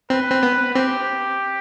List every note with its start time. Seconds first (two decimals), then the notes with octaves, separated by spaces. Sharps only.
0.10 C4 B4
0.31 C4
0.43 B3
0.75 C4 G4